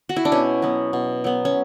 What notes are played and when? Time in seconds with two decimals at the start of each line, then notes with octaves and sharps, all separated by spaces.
0.09 F#4
0.16 E4
0.25 D4
0.32 B2 C#4
0.62 F#3 B3
0.93 B2
1.24 F#3 B3
1.45 C#4